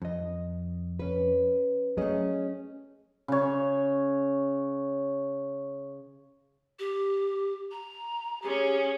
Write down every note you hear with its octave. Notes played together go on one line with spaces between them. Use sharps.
F2 D#5
C#4 B4
F#3 A3 C#4 G#4 D#5
C#3 C#5
G4
A#5
C#4 G4 G#4